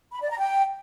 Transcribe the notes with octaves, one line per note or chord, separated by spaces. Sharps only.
B5
D5
A#5
G5